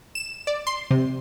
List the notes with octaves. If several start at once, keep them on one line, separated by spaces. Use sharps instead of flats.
E7
D5
C6
C3